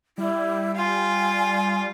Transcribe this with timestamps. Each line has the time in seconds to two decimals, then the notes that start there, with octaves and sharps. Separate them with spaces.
0.18 G3 E4
0.76 F4 G#5